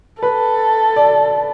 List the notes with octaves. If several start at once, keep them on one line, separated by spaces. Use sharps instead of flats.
A4 B4
D5